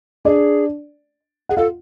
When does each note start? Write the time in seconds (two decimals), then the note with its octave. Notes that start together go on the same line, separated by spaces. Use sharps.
0.25 D4 G#4 D5
1.49 G#4 F#5
1.57 F4 A4 F5